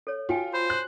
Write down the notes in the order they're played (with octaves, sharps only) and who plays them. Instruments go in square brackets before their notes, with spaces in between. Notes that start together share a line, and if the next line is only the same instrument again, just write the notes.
[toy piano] A4 C#5
[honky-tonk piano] F4 [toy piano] F#4 G5 G#5
[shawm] C5 [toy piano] B5
[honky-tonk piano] F#6